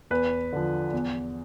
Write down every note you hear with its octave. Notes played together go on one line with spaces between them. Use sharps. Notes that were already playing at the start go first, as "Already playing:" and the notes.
E2 B4
D3 F3
E2